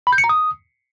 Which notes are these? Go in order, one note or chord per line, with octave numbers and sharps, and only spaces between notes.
B5
G6
C#7
A#5
D#6